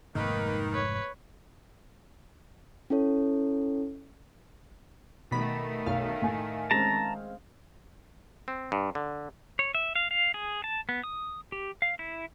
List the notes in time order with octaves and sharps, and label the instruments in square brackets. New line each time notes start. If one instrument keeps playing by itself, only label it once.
[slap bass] F1 G#2 G#3 [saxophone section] D#3 [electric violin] A#3 B4
[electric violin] B4 C#5
[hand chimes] C#4 E4 A4 C#5
[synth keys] B2 B5 [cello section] D#3 A3
[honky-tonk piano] B1 [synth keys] F5
[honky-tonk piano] A2 G#5
[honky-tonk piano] G#3 C4 C#4 [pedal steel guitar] A5 A#5
[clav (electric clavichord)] C4
G2
D3
[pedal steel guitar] C#5
E5
F5
F5
G#4
A5
B3
D#6
G4
F5
E4